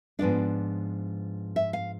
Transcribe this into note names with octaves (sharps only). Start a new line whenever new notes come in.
G#2 F3 B3 D4 D5
E5
F5